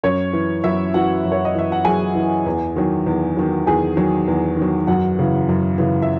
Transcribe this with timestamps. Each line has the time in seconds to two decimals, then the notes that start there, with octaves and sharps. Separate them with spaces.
0.03 F#2 C#4 C#5
0.33 E3
0.64 F#2 E4 E5
0.94 E3 F#4 F#5
1.25 F#2
1.32 C#5
1.45 D#5
1.55 E3 E5
1.72 F#5
1.85 F#2 G#4 G#5
2.15 E3
2.46 E2
2.76 D#3 F#3
3.06 E2
3.37 D#3 F#3
3.67 E2 G#4 G#5
3.97 D#3 F#3
4.28 E2
4.57 D#3 F#3
4.87 F#2 F#4 F#5
5.19 C#3 E3
5.49 F#2
5.78 C#3 E3
6.02 E5